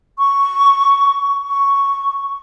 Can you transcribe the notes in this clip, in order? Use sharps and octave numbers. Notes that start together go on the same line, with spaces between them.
C#6
C#6